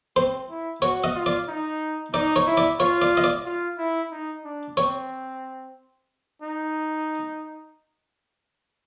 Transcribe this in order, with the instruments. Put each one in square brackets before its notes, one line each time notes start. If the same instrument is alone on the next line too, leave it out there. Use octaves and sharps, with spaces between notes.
[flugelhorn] C4 [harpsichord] C5
[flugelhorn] E4
[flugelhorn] F#4 [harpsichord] C#5
[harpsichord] D#5
[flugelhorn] F4
[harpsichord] D5
[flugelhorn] D#4
[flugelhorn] D#4 [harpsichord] D5
[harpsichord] C#5
[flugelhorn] E4
[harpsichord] D5
[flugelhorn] F4 [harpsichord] C#5
[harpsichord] D5
D#5
D5
[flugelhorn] F4
E4
D#4
D4
[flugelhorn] C4 [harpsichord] C#5
[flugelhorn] D#4